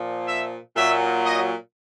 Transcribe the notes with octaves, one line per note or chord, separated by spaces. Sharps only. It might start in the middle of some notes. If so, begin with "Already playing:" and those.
Already playing: A#2 F3
E5
A#2 F#3 E5
D#5